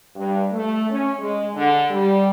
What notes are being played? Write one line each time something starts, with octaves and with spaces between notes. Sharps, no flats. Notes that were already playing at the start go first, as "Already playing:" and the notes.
G2
A3
C#4
G#3
D3
G3